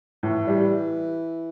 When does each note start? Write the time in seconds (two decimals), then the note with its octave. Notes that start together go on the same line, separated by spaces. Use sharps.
0.23 A2 E3
0.47 G3